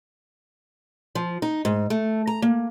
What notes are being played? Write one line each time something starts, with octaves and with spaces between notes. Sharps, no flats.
F3
D#4
G#2
A3
A#5
A#3